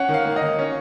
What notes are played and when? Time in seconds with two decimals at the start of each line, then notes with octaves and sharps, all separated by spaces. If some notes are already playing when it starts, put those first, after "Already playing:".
Already playing: C#4 F#5
0.09 D#3
0.14 F5
0.25 A#3
0.36 D#5
0.42 D#3
0.59 C#4